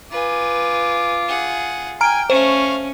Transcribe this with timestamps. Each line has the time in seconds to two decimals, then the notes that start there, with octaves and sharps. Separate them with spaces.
0.11 F4 B4 G#5 D6
1.28 G#4 F#5
2.01 G5 G#5 A#5 F6 D7
2.30 A3 C#4 C5 F5 C#6